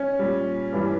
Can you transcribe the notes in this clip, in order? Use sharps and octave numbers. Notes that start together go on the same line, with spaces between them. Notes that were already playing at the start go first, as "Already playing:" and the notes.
Already playing: C#4
A#2 G3
G2 E3 G3